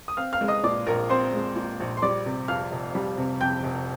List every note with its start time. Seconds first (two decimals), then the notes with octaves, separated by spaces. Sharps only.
0.08 D#6
0.17 C4 F5 F6
0.33 F5 F6
0.41 G#3
0.48 D#5 D#6
0.64 A#2 D5 D6
0.87 A#1 A#4 A#5
1.09 C4 C5 C6
1.34 G#3
1.56 A#2
1.80 A#1
1.97 C6
2.02 G3 D5 D6
2.26 C3
2.48 F2 F5 F6
2.72 F1
2.95 G3
3.18 C3
3.40 F2 G5 G6
3.64 F1